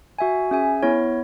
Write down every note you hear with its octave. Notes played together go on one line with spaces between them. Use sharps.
F#4 E5 G#5
C#4 G#4 E5 G#5
B3 E4 C#5